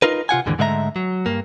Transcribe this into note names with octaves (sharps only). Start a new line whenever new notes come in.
D#4 F4 A#4 B4
C3 F4 F#5 G#5
D#2 G#2 D3 E3
G#2 D3 G#3 A3 E5 A#5
F#3
G2 A#3